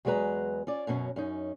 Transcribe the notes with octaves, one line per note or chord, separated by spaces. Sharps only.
E2 F#3 G#3 G#4 B4 A#5
C#4 F4 D5
F#2 B2 F#3 C#4
F#2 C#4 D#4